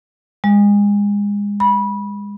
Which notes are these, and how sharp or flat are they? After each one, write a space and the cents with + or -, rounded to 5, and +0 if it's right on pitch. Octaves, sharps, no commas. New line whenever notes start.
G#3 -30
B5 -20